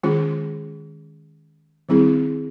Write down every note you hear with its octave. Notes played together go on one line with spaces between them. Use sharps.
D#3 G#3 C#4 F4 G#4
D#3 G3 C4 E4 G#4